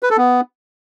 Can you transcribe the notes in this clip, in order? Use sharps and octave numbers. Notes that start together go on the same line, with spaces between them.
B4
A4
B3